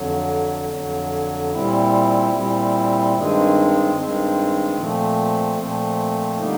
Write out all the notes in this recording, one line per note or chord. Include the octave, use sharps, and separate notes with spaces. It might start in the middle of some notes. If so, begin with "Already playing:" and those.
Already playing: F2 D3 F#3
F2 D3 F#3
A#2 G3 C4 E4
A#2 G3 C4 E4
G2 D#3 G#3 C4
G2 D#3 G#3 C4
A#2 F3 A3 C4
A#2 F3 A3 C4
D3 G3 A#3 D#4